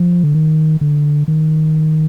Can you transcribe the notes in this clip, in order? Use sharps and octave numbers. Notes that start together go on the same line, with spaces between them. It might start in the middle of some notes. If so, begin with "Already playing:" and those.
Already playing: F3
D3
D#3
D3
D#3